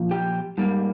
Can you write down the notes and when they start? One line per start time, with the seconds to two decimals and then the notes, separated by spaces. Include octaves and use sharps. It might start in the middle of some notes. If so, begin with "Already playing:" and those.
Already playing: A#2 F3
0.11 G4 G5
0.58 G#2 G3 A#3